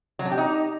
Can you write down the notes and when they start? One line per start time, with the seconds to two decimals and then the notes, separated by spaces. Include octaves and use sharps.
0.19 F#3
0.25 D4
0.31 G4
0.38 D#4